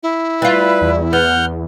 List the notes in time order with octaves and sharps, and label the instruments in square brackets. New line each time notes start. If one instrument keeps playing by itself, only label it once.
[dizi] E4
[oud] G3 F4 [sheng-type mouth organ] B4
[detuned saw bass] E2
[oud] B3 [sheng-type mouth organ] F#5 F6 G6